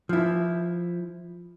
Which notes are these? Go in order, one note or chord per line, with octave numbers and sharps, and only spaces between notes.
F3 E4